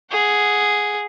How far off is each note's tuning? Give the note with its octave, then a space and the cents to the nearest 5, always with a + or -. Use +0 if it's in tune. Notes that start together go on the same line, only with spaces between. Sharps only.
G#4 +0 F#5 -5